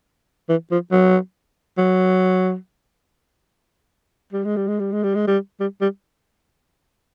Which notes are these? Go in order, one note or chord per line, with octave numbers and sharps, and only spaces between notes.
E3
F3
F#3
F#3
G3
G#3
G3
G#3
G3
G#3
G3
G#3
G3
G3
G3